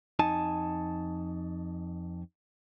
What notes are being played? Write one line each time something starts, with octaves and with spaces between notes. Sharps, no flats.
F2 D#4 G#5 A5